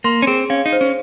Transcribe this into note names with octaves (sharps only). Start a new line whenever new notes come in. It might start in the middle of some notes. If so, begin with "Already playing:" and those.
A#3 C6
C#4
C4 G#4
C#4 F5
D#4
C5
C#4